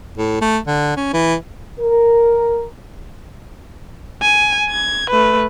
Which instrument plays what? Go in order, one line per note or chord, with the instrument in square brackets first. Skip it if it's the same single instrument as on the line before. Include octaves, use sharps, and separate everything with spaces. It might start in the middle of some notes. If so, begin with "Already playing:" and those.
[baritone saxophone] A2
A3
D3
C#4
E3
[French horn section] A#4
[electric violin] G#5
G#6
A3 B4